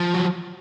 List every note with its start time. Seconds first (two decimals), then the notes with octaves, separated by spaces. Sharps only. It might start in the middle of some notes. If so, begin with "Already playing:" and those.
Already playing: F3
0.14 F#3